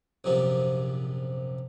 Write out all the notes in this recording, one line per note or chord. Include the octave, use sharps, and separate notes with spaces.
A#1 F#2 C3 F3